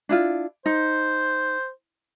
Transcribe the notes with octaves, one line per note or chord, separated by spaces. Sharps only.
D4 E4 F4
D#4 C5